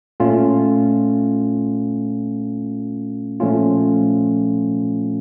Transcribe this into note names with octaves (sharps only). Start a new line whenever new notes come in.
A#2 A3 C#4 F4
A#2 F3 A3 C#4 F4